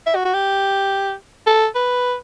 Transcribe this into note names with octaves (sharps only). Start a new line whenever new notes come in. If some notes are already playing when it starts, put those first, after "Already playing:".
E5
F#4
F#4
G4
A4
B4